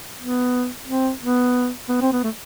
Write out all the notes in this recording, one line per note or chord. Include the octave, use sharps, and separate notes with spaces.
B3
C4
B3
B3
C4
B3
A3